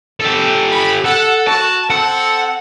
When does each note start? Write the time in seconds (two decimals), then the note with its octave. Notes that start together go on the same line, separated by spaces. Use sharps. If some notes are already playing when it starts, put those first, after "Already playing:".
0.20 G4 A4
0.71 B5
1.05 A4 F#5
1.47 F#4 A5
1.90 C4 A4 F#5